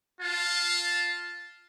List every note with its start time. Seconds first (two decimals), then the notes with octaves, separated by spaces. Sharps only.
0.21 F4 F5 A5